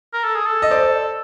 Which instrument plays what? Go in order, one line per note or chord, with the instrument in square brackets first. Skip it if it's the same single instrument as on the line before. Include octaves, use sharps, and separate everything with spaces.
[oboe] A#4
A4
G#4
A4
[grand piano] D#5
C5 D5